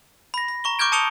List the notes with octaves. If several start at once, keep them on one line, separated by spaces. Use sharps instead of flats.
B5 A#6
B5
A#5 C#6 G7
C#6 D6 F6 G6 G#6 D7
A5 D#6 C#7 F7 G7